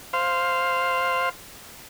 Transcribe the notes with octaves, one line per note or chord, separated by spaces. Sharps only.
C5 F5